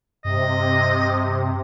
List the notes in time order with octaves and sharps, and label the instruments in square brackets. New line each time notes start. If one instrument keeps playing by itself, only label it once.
[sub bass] G2 [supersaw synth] C3 [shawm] D#5